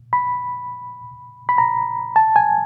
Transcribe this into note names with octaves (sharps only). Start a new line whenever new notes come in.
B5
B5
A#5
A5
G#5